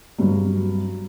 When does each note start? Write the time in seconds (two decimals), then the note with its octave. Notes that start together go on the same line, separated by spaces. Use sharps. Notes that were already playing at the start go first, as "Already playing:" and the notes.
0.18 G2 F#3